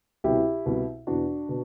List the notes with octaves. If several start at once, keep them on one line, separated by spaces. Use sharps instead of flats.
C2 B2 E4 G4
C2 B2
E2 B2 D4 F#4
B2